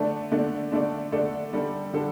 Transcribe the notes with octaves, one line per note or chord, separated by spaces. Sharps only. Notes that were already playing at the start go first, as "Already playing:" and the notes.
Already playing: D3 A3 D4 A4 D5
D3 A3 D4 A4 D5
D3 A3 D4 A4 D5
D3 A3 D4 A4 D5
D3 G3 D4 A4
D3 G3 D4 A4